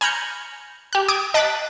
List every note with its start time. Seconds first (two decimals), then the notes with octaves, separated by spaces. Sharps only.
0.01 G#5 A#5 B5 F6 G6 C#7
0.93 G4 F#6
1.08 D6 D#6 G#6 D7
1.34 D#5 A5 D6 F#6 A6 B6